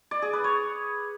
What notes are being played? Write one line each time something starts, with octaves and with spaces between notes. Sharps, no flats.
D5
G#4
B4
C#5